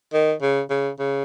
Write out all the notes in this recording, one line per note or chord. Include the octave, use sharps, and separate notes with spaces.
D#3
C#3
C#3
C#3